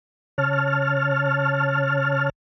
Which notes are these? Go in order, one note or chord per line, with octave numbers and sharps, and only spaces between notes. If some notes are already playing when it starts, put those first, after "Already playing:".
C#3 C#5 A5 F6